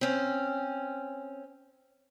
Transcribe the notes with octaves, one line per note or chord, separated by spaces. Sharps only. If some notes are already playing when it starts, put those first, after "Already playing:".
C4 C#4